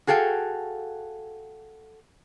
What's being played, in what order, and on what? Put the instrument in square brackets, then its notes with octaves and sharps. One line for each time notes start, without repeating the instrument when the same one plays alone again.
[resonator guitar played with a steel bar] F#4 G#4 A4 F5 G5